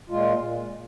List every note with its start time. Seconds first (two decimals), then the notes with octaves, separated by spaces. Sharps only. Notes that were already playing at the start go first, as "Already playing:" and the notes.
0.10 A#2 G#3 F4